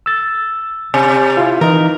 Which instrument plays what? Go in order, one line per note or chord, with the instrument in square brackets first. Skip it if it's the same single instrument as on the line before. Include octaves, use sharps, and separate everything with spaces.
[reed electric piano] E6 A6
[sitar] C3
[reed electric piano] E4 F4
[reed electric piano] E3 D#4 [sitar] A#4